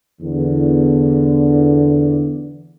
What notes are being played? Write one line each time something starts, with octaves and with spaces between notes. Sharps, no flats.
E2 D3